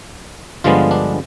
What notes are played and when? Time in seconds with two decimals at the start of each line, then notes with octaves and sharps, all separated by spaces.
0.64 G2 D3 F3 G#3 B3 F4
0.91 D4